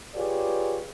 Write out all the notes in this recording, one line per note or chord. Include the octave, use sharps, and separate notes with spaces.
F4 G4 G#4 B4 C#5 D5